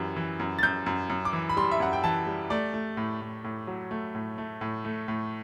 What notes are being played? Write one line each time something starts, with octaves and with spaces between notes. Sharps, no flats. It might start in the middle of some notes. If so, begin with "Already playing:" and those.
Already playing: F#2 E3 G3
E3
F#2
A6
F#2 G6
F#2
F#2
D6
E3
B5
G3 C6
E5
F#2 F#5
G5
E3 A5
G3
A3 D5
A3
A2
A2
A2
F#3
A3
A2
A3
A2
A3
A2